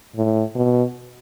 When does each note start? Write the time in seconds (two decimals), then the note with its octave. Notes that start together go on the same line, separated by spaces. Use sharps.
0.16 A2
0.55 B2